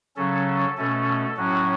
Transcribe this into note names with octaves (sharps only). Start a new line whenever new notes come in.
C#3 F#3 C#4 A4
B2 A3 C#4 A4
A2 F#3 C#4 F#4